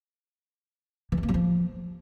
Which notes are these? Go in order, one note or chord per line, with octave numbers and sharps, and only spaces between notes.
E3
G#3
A#3
F#3
F3